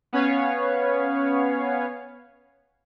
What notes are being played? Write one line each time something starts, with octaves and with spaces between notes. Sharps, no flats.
B3 C#4 B4 C#5 F5